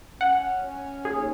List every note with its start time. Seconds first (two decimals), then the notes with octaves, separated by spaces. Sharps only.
0.21 C#4 F#5
0.62 C#4
1.05 D#2 G#4